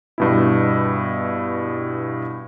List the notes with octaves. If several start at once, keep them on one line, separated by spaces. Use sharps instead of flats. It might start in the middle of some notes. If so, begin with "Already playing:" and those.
G2 B2 E4